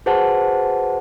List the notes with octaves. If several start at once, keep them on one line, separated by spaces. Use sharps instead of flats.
F#4 G#4 B4 C5 F#5 A5